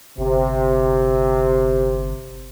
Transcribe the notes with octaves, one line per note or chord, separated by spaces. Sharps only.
G1 C3